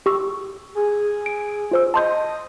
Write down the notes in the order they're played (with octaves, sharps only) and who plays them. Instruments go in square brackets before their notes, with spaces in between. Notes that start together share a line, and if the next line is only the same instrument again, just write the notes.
[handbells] G4 C#6 E6
[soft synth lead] G#4
[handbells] D7
F4 C5 E6
[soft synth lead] D#5 [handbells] A5 C6 G6